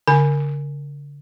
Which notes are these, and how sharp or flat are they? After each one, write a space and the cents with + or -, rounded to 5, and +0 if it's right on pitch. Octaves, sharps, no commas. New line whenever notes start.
D3 -40 G#5 +0